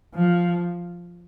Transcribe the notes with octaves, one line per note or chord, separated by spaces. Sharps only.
F3